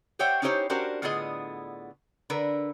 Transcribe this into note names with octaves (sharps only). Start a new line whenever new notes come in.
G4 C5 C#5 E5 F#5 G5
C#4 D#4 E4 G4 C5 C#5
C#4 D4 F#4 G4 A#4 C5
A2 D3 B3 F4 G#4 D#5
D3 A#4 B4